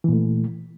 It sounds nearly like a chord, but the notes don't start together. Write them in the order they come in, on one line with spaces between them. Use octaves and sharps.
E3 A#2 A3